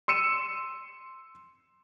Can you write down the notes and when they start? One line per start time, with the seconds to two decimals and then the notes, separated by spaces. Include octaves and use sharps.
0.08 C6 E6 C#7 D#7 E7